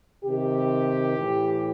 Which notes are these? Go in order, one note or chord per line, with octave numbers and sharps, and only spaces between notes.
C3 D#3 G4
A2 E3